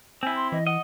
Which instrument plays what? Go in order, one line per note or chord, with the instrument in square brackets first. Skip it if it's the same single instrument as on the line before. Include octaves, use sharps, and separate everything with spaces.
[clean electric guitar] C4 E4 [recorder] G#5
[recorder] C6
[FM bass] E3 [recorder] D#5
[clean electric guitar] D#5 [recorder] F#5